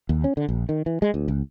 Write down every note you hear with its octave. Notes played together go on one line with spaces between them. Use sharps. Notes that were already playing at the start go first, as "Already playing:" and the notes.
D#2
C#4
D3
A#1
D#3
E3
G#3
D2
C#2